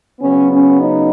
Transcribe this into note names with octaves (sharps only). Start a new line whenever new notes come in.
C#3 F#3 B3 C#4
C#4
D#4